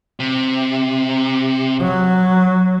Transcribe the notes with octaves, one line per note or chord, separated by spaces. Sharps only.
C3
F#3